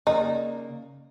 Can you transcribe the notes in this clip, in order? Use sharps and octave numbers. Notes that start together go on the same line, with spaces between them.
C#3 A#3 D#4 D5